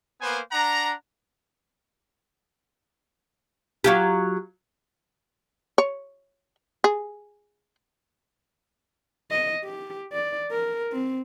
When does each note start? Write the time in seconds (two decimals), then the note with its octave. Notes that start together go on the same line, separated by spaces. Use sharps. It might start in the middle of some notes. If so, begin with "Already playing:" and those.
0.22 A#3 B3 B4 C5 G#5
0.52 D4 F#5 A#5
3.84 F#3 F4 G4
5.78 C#5
6.84 G#4
9.31 D#5
9.64 G4
10.13 D5
10.51 A#4
10.92 C4